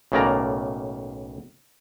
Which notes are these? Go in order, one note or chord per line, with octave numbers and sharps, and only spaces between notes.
B1 A2 C#3 A#3 D5 A#5